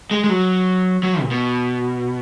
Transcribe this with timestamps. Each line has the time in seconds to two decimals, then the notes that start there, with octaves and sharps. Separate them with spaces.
0.11 G#3
0.24 G#3
0.30 F#3
1.03 F#3
1.22 A#2
1.31 B2